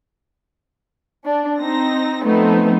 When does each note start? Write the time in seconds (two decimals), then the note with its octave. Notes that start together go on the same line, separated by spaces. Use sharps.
1.24 D4
1.59 C4 D#4 A#6
2.24 F3 A3 B3 C4 D#4